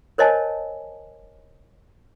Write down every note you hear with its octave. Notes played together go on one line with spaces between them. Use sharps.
A#4 C5 C#5 D#5 G#5 A5